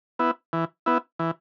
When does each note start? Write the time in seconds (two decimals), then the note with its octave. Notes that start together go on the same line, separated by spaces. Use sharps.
0.19 B3 E4
0.53 E3
0.86 B3 E4
1.19 E3